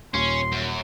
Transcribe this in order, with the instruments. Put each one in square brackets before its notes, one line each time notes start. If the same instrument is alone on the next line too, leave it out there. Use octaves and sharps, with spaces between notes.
[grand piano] D#1 [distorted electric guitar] C#4 [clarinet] C6
[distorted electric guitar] F#2